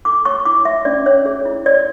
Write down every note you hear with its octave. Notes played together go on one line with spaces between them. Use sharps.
A4 D6
C#5 C#6
E4 D6
C#5 E5
C#4 D5
C#4 C#5
G#4
E4
C#5 D5